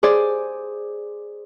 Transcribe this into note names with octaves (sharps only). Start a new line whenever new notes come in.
G#4 C5 D5